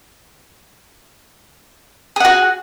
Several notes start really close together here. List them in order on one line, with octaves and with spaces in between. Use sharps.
G#4 F#5 F#4